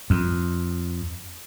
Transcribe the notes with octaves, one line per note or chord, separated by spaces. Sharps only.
F2